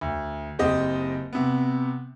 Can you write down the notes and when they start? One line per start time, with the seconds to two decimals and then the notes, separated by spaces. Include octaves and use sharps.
0.01 D2
0.59 F#1 C4 G4 D#5
1.33 C3 B3